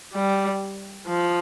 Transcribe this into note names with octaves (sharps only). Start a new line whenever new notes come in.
G3
F3